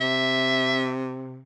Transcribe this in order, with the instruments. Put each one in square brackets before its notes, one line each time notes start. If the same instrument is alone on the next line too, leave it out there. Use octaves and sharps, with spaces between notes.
[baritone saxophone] C3 [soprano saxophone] E5